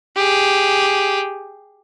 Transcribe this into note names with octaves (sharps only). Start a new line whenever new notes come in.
G4 G#4